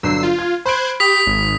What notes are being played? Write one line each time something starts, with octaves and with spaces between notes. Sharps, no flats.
G1 D3 F#3 E6 C7
F4
F6 G#6
C5 B5 C6 F#6 G#6 D7
G4 D#6 B6
G#1